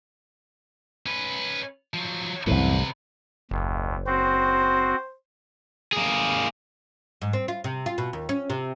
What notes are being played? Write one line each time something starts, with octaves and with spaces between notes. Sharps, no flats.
C#4 B4
F3 F#3
C2 F#2 A2 C3 E3 C4 B4
F#1 D#2
C4 F#4 C5
A#3 G#4
G#2
C4
F4
C3
F4
B2
D#2
C#4
C3